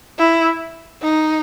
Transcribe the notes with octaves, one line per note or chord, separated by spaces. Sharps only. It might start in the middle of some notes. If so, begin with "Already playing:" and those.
E4
D#4